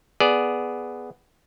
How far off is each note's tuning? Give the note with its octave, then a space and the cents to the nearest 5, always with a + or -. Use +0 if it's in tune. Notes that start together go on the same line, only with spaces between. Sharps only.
B3 +0 G#4 +0 D5 +0